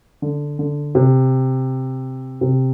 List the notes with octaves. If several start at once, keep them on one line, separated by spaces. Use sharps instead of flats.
D3
D3
C3
C3